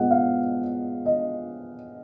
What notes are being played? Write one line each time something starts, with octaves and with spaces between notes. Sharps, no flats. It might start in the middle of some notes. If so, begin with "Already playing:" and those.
Already playing: A#2 G#3 B3 D#5 F#5
F5
D#5